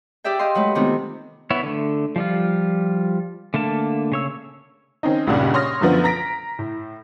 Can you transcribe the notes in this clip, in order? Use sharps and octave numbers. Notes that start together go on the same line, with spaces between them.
G4 G#4 D5 E5 G5
G4 D#5 F5 C6
F#3 G#3 A3 B4
C3 D#3 A3 B3 C4 F4
B3 E4 C#5
D3 A3
F3 G3 F4
D3 A3 A#3 A5
C#3 C#5 E6
D#3 C4 C#4 D#4
C#2 G2 A#2 C#3 D5 F#5
C#5 C6 C#6 D#6 F6 A#6
F#2 D3 F3 B3
A#5 A#6 B6 D7
A2